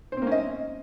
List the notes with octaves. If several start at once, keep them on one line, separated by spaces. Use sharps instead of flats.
A#3 C4 C#4 C5 D#5